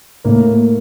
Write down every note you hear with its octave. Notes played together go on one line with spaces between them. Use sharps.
A2 A#3
A#3